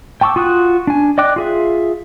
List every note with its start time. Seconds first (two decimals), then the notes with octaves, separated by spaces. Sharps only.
0.21 G5 A5 C#6 D6 E6
0.36 F4 F#4 D#6 F#6
0.87 D4 G#5
1.18 D5 D#5 G5 D6 F#6
1.36 F4 G#4 E5